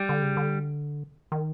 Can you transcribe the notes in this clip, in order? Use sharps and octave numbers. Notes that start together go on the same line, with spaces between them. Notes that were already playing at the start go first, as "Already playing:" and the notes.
Already playing: G3
D3
C#3
D3
D#3